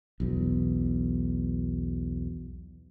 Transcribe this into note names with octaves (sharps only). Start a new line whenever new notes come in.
B1 E2